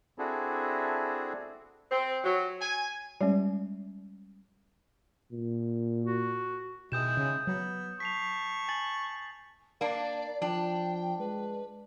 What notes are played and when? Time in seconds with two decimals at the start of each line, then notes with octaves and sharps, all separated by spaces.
0.18 C4 D4 E4 F#4 G#4 A4
1.90 C4
2.24 F#3
2.60 G#5
3.21 G3 G#3 C#4
5.32 A#2
6.04 F#4
6.92 B2 D#3 G#3 E4 D#6 G6 E7
7.17 C#3
7.47 F#3 B3
8.00 A5 C#6 B6 C7 F7
8.68 G#5 A6 F#7
9.81 A#3 D4 D5
10.42 F3 D4 G5
11.19 G#3 B4